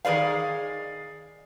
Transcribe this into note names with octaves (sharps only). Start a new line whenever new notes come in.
D#3 G#4 B4 D5 F5